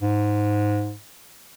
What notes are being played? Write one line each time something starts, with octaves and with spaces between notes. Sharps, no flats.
G#2